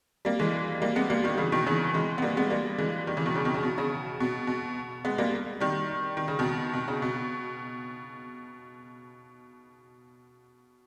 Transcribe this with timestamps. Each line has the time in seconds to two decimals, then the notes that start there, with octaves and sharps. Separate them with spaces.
0.25 G3 A#3
0.39 E3 G#3
0.81 G3 A#3
0.96 G#3 B3
1.10 G3 A#3
1.24 D#3 G3
1.38 C#3 E3
1.52 B2 D#3
1.66 C#3 E3
1.94 E3 G#3
2.18 B3
2.22 G3 A#3
2.37 G#3 B3
2.50 G3 A#3
2.78 E3 G#3
3.07 D#3 G3
3.17 C#3 E3
3.26 B2 D#3
3.35 C#3
3.45 B2 D#3
3.54 C#3
3.63 B2
3.78 C#3
4.20 B2
4.47 B2
5.05 G#3 B3
5.18 G3 A#3
5.60 D#3 G3
6.17 D#3
6.28 C#3
6.39 B2 D#3
6.74 B2
6.88 C#3
7.02 B2